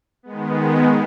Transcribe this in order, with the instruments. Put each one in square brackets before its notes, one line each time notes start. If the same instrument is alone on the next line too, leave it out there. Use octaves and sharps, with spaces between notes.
[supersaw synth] D#3 G#3 B3